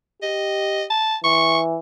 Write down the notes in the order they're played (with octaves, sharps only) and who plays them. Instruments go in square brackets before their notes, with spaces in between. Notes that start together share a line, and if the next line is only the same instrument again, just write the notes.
[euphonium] G4 [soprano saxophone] D#5
[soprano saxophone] A5
[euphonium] E3 [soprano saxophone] C#6